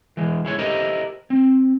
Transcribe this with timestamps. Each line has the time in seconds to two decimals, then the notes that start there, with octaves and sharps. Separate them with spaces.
0.17 E3 G#3
0.45 G#3 E4 C#5
0.59 E4 G4 A4 A#4 C5 D#5
1.30 C4